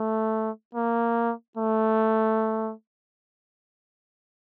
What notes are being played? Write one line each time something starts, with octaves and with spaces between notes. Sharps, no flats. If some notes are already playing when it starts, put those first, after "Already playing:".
Already playing: A3
A#3
A3